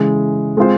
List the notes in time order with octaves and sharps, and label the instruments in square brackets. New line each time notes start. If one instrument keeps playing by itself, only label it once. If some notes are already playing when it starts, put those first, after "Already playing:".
Already playing: [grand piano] C#3 E3 G#3
G#3 C4 F4 C5